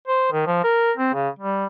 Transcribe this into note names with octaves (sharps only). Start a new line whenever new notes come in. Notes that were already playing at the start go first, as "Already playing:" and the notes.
C5
D#3
F3
A#4
C4
C#3
G3